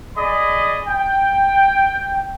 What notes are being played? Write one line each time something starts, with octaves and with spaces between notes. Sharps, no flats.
G#4 D5 D#5 B5
G5